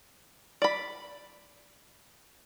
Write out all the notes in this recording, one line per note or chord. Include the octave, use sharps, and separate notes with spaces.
D5 B5